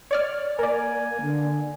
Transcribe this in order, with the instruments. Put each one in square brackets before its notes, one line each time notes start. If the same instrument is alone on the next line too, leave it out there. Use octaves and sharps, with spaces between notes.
[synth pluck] C#5 D5 F6
[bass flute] A#3 [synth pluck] A#4 D5 [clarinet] G#5
[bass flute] D3